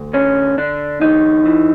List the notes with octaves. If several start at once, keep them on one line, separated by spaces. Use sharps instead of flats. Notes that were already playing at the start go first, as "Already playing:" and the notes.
Already playing: D2
D3 C#4
D3 D4
E2 D#4
E3